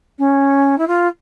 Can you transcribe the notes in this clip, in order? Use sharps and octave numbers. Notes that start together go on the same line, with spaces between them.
C#4
E4
F4